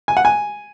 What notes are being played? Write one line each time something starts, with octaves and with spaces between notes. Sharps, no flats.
G#5
F#5
G#5